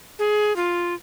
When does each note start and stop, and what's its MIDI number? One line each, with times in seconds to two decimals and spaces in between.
0.19 0.55 68
0.56 0.94 65